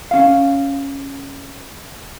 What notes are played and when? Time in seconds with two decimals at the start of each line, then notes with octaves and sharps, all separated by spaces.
0.11 C#4 F5